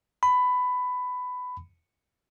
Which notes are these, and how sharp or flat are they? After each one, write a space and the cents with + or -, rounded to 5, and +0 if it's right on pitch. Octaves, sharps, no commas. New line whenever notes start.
B5 +15